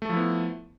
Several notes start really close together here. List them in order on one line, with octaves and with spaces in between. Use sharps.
A3 A4 F3 E4 B3